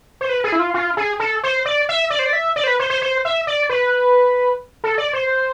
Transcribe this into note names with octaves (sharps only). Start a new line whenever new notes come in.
C5
B4
G#4
E4
F4
F4
G#4
A4
C5
D5
E5
D5
C5
D5
E5
D5
C5
B4
C5
C5
C5
E5
D5
B4
A4
D5
C5